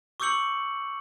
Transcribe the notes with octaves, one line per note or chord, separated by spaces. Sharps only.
C#6 D6 E6 G6 C#7 F#7